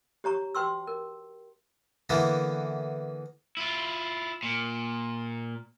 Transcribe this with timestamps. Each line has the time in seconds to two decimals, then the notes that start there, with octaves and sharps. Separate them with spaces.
0.24 G4 C#5 A#5 C#6
0.55 F#4 B4 G5 C6 C#6 E6
0.87 A#4
2.09 D3 E3 A#3 B3
3.57 E4 F4
4.43 A#2